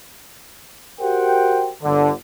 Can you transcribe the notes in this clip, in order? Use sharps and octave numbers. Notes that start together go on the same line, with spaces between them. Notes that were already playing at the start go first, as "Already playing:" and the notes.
F#4 G4 A#4 C5 F#5 G5
G1 D3